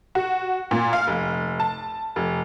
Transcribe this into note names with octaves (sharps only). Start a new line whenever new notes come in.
F#4
A#2
F5
F1
A5
F1